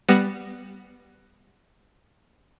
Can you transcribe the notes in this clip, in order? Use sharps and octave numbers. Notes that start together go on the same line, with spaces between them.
G3 B3 A#6